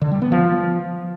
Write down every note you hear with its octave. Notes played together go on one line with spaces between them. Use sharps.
D3
G3
B3
F3